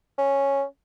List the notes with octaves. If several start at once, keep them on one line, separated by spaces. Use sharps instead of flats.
C#4